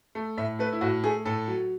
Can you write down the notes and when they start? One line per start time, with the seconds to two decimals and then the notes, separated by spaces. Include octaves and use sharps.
0.15 A3
0.37 A2 E5
0.59 A3 B4
0.73 E4
0.81 A2 F#4
1.04 A3 G#4
1.25 A2 A4
1.48 F#3